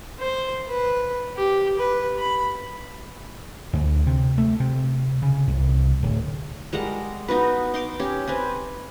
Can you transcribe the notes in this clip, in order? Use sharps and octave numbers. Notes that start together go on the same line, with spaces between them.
C5
B4
G4
B4
B5
D2
C3
A3
C3
C#3
C2
D1
G3 G#3 A#4 F#5
B3 D#4 F#4 B4
D#4 C6 D6
C#4 G4
C4 B4 G#5